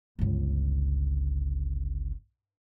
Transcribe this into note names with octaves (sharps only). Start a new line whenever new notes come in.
G1 C#2